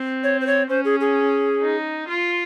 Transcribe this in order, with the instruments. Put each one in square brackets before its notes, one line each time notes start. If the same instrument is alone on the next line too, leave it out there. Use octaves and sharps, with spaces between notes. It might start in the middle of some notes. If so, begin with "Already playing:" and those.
Already playing: [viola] C4
[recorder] C#5
C5
C#5
[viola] C#4 [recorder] C5
[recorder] G#4
G#4
[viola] D#4
F4